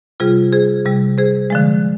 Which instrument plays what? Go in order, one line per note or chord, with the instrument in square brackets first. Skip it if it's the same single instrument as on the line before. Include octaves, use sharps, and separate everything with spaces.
[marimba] C3 G3 F4 G#4
G#4 C5
C3 G3
G#4 C5
D3 F3 G#3